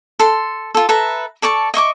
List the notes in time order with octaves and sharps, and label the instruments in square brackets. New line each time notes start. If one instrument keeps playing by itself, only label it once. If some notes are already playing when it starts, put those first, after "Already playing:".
[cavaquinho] A4 C6
F4 A4
A4 B4 E5 A#5
A4 D5 A5 C#6
D#5 E5 C#6 D6